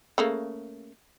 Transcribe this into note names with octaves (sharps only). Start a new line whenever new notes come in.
C#3 A3 A#3